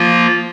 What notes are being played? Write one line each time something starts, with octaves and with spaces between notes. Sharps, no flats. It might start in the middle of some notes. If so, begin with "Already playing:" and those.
Already playing: F3 A#3 F4